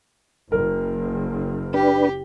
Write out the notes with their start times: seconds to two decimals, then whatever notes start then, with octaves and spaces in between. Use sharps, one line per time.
0.52 F#1 A#4
1.74 D4 G4 B4